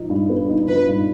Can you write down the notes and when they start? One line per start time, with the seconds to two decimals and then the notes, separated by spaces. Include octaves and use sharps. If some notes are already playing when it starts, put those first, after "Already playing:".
Already playing: F3 D#4
0.10 G2
0.30 B3
0.48 D#4
0.68 F3 B4
0.87 G2